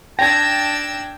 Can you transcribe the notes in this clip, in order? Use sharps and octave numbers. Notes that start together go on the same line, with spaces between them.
D4 G5 A5 E6 G#6 A#6